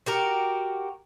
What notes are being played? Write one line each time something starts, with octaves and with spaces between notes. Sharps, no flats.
F#4 G4 A#4